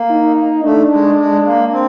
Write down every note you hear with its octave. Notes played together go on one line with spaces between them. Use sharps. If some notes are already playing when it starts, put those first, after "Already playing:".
Already playing: A#3
D#4
A3 D4
G#3
G#3
A#3
C4